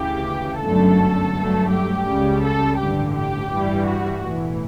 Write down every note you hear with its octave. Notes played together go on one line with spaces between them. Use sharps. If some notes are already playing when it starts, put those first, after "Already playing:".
Already playing: D2 C#3 E3 G4
G1 F#2 D3 F#3 A3 A4
G2 F#3 A3
G4
C#2 C#3 G3
A4
A1 G2 D3 G4
G4
G2 E3 G3
F#4
B1 A2 E3